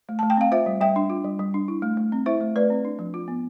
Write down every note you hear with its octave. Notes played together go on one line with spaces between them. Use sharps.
A3
A3 A5
G5
C4 F5
F4 C5 E5
G3
G3 E5 G5
D4
F4
G3
G3
D4
E4
A3
A3
C4
E4 C5 E5
A3
A3 B4 D5
C4
D4
F3
F4
B3